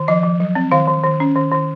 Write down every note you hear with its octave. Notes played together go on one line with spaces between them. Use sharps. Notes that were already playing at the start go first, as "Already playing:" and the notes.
Already playing: D#3
F3 D#5
F3
F#3
C4
D#3 F5
D#3
D#3
C#4
D#3
D#3